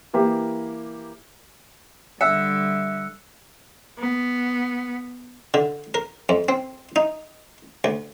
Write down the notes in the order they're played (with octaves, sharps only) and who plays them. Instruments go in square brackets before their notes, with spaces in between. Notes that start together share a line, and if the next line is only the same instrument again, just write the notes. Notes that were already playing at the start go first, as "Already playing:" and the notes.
[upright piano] E3 A#3 E4 G4
[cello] D3 G3 [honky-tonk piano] E5 [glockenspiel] E6 F#6 C#7
[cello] B3
[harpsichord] D3
A#4
F2
C4
D#4
D2